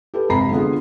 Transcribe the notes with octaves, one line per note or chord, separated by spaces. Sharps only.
G4 A4 B4
G#1 C3 A#5 B5 C7
D3 B3 F4 G#4